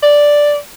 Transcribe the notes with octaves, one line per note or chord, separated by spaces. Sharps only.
D5